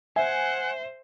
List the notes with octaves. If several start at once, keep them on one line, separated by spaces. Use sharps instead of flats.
C5 E5 F#5 G#5